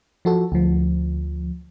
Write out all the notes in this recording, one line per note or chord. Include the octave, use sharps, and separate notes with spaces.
F3 F#4 A4
D2 F3